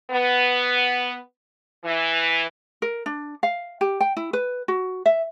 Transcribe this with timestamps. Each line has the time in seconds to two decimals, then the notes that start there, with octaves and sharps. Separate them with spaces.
0.11 B3
1.85 E3
2.82 A#4
3.06 D4
3.43 F5
3.81 G4
4.01 G5
4.17 E4
4.33 B4
4.68 F#4
5.06 E5